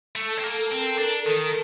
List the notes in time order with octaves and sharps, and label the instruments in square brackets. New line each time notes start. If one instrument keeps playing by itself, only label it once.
[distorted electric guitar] A3 [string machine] A4
[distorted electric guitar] C4
A#3
[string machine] A#4
[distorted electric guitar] C4
[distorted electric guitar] D4 [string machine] A4
[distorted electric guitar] D#3